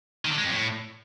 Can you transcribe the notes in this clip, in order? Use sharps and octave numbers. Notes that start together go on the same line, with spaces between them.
D#3
D3
G#3
F2
A2